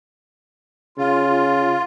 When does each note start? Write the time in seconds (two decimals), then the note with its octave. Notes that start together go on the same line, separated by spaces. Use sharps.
0.98 C#3 F4